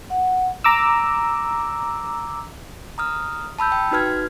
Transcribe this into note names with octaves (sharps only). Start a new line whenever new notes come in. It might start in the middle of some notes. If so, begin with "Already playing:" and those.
F#5
A#5 D6 E6
A#5 D#6 F6
A5 B5 E6 G6
G5
D#4 F#4 B4 F6 G#6